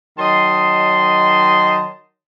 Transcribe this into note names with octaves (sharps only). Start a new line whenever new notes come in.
D#3 F#3 D#5 A5 C6